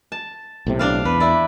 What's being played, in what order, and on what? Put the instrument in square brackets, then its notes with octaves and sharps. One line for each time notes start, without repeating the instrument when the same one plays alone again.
[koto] A5
[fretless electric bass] B1 A2 C3
[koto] D4 D5 F5
[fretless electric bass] E2 [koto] B4
[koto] E4 D5